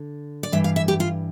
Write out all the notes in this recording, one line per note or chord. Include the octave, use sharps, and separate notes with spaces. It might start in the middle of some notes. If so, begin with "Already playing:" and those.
Already playing: D3
D5
G2 E3 E5
F5
E5
G4
F4